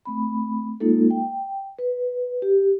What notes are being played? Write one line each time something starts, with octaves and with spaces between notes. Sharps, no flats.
A3 C4 B5
G#3 A#3 D#4 F4 A4
G5
B4
G4